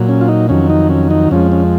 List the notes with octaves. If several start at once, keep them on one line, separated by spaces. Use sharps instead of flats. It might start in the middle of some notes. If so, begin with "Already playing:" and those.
Already playing: A#2 F#3
C#4
F4
D#4
F2 D#3 F#3 C#4
D#4
C#4
D#4
F2 F3 G#3 C#4
C#4